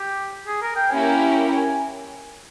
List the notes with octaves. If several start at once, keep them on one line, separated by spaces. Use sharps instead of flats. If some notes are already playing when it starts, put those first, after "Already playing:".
Already playing: G4
G#4
A#4
G5
A#3 C#4 E4 G4 A#4 G#5
G#5